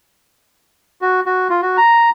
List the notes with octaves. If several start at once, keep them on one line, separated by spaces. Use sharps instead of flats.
F#4
F#4
F4
F#4
A#5